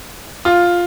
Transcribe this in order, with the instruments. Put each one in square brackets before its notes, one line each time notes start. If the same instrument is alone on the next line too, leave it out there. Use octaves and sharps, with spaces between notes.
[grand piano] F4